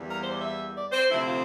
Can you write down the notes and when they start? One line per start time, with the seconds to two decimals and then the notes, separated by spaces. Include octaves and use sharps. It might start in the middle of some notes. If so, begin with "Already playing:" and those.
Already playing: E2 E3 G3 A#3
0.10 A#4
0.20 C5
0.30 D5
0.39 E5
0.74 D5
0.91 C5
1.09 D2 C3 F3 C4 E4
1.26 F4